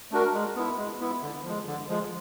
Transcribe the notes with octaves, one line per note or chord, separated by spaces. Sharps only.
A3 D4 F#4 A#4
G#3
B3 E4
G#3
B3 E4
D3
F3 G#3
D3
F3 G#3